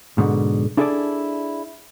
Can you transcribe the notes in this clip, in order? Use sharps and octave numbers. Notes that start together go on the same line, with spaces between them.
F2 G#2 B2 D3
D4 E4 G#4 A4 B4 D5